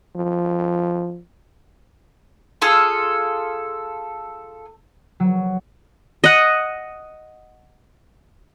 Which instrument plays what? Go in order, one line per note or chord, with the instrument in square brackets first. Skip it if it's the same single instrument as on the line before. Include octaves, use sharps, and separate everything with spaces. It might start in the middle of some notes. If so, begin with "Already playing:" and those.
[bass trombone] F3
[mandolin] F4 G#4 A4 F5
[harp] F#3
[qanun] D#5 F#5